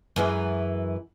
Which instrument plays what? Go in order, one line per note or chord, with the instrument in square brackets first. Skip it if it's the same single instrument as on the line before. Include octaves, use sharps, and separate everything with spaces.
[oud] F#2 E3 G#3